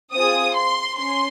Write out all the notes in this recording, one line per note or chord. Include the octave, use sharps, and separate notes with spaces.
C4 F4 G#4 D#6
C6
C#4 C6